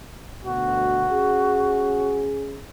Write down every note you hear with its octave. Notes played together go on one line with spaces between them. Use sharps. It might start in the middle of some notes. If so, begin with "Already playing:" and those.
D2 B2 F#4
C#4 G#4